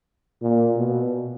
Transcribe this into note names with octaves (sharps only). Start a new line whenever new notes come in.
A#2
B2